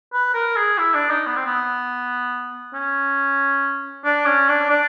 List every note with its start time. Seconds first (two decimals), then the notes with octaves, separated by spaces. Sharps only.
0.13 B4
0.34 A#4
0.57 G#4
0.78 E4
0.94 D4
1.10 D#4
1.26 B3
1.36 C4
1.46 B3
2.74 C#4
4.05 D4
4.26 C#4
4.48 D4
4.70 D4